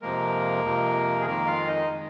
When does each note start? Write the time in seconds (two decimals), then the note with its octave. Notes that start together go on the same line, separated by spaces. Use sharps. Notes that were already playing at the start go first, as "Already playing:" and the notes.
0.02 F2 C3 F3 G#3 A#3 A#4
0.64 F2 C3 F3 G#3
1.20 G#4
1.26 F2 D#3 G#3 A#3 A#4
1.46 F4 F5
1.67 D#4 D#5
1.90 D#3 G#3